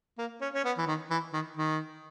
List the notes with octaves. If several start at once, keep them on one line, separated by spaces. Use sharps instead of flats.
A#3
C#4
C#4
B3
E3
D#3
E3
D#3
D#3